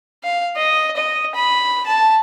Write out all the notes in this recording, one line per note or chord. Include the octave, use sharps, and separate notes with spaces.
F5
D#5
D#5
B5
A5